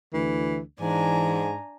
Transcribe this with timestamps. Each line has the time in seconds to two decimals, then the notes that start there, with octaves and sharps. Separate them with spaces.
0.13 D2 E3
0.81 G#2 E3 D4 G#5 A#5